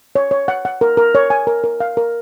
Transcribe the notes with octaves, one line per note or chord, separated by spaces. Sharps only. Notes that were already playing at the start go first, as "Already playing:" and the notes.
C#5
C#5
F#5
F#5
A#4
A#4
C#5
G#5
A#4
A#4
F5
A#4